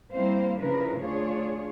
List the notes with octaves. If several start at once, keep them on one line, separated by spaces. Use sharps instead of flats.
G3 A#3 C4 E4 C5 F5
C#3 F3 D4 E4 A#4 B4
D2 D4 F4 G#4 C#5